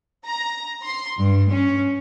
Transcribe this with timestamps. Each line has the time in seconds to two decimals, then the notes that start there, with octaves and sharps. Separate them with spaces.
0.24 A#5
0.84 C6
1.19 G2
1.50 C#4